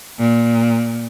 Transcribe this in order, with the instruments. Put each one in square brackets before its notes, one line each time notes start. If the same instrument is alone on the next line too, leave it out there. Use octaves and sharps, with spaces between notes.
[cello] A#2